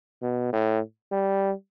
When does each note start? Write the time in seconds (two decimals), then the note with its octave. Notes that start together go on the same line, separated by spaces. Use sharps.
0.22 B2
0.52 A2
1.12 G3